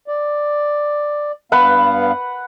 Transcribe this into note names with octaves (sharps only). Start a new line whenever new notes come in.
D5
G2 B3 B4 F5 F#5